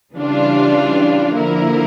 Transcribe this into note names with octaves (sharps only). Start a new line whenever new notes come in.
C#3 E3 G3 D4 F4
D3 F3 A#3 E4 A#4